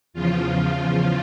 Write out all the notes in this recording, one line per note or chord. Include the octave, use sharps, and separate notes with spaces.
E2 C#3 F3 F4